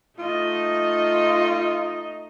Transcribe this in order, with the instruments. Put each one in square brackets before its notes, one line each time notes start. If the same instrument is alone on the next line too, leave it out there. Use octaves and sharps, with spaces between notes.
[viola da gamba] A3 D#4 D#5 [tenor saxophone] F4